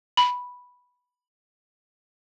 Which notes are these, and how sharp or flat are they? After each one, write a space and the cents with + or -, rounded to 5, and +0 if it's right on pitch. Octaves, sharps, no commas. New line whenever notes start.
B5 -5